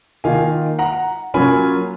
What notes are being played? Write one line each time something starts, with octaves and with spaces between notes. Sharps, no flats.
D#3 A#3 F4 F5 G#5
F#5 A#5
F#3 A#3 C#4 F4 G#5 B5